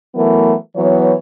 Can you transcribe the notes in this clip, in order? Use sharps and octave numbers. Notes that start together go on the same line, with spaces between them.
E3 F#3 A3 B3 A#4
E3 F#3 B3 C#5